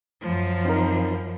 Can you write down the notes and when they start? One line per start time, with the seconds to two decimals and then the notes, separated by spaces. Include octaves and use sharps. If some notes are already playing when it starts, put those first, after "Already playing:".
0.21 F#2 F3
0.65 C4 D#4 A#4